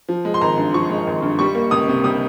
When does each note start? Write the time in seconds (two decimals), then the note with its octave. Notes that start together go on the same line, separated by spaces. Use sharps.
0.09 F3
0.25 G#3
0.34 C6
0.41 G#1 A#5
0.57 G2
0.74 F3 C#6
0.90 G#3
1.07 G#1
1.22 G2
1.39 G3 C#6
1.55 A#3
1.71 C#2 D#6
1.88 C3
2.04 G3 D#6